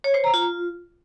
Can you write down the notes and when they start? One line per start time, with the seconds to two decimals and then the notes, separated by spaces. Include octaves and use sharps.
0.04 C#5
0.14 C5
0.24 A#5
0.34 F4